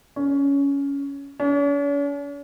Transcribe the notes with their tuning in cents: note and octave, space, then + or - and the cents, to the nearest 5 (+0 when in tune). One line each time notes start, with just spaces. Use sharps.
C#4 +15
C#4 +45